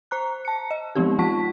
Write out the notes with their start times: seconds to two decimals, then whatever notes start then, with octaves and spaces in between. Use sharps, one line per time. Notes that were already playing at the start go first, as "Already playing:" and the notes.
0.11 C5 A#5 F#6
0.45 A5 C#7
0.71 D#5
0.95 F3 G#3 B3 C4 D#4 G4
1.19 F3 F4 A5 C#6 B6